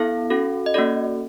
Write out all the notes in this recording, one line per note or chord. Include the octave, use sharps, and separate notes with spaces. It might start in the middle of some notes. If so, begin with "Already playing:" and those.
Already playing: B3 E4 A4 F5
C#4 F#4 A4
D#5
A#3 C#4 F#4 A4 D5